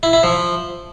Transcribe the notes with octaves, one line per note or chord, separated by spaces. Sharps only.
E4
E4
F3